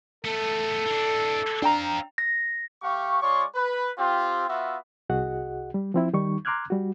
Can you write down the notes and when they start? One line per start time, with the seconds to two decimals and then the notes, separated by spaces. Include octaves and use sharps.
0.25 A3 B3 A4
0.86 E3 D4
1.62 C4 D4 F5 G5 A#5
2.18 A#6
2.82 A3 G4 F5 C#6
3.22 G#3 F4 C#5 D5 C6 C#6
3.55 B4
3.98 C4 F4 G4
4.48 B3 F4 F#4 E5
5.10 C2 F#4 G#4 D#5 F#5
5.74 G3
5.94 F3 C4 E4
6.13 D#3 G3 D#4 C#6
6.45 A#5 C6 D6 F6 F#6 G#6
6.70 G3 F#4